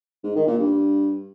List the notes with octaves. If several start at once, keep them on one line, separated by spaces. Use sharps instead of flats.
G#2
D#3
A#2
G2